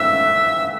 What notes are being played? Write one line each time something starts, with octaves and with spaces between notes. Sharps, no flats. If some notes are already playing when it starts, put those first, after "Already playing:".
Already playing: E5 E6